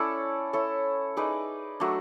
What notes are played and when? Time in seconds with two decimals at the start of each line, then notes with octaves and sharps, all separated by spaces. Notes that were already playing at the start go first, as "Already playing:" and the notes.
Already playing: C#4 E4 A4 D5
0.53 E4 A4 C#5
1.17 D#4 G#4 B4 D5
1.80 F#3 A3 D4